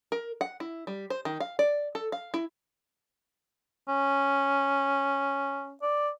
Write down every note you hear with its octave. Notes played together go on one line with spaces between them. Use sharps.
A#4
F#5
E4
G3
C5
D#3
F5
D5
A4
F5
E4
C#4
D5